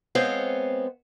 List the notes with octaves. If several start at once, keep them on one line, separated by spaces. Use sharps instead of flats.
G#3 B3 C4 C5 C#5 F5